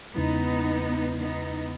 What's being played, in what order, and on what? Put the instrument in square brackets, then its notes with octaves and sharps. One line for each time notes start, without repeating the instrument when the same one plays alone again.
[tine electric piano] E2 C#3 G#3 C#4 E4 [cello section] B3 D#4
[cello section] B3 D#4